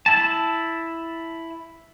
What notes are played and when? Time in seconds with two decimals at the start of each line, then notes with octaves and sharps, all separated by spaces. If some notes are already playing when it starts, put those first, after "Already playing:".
0.06 E4 A5